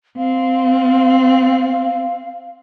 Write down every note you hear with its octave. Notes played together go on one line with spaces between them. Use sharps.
C4 F5